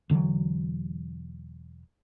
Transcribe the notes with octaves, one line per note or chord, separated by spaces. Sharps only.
E1 D3 E3 F#3